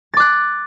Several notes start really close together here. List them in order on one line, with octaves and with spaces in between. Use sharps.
A6 D6 F#6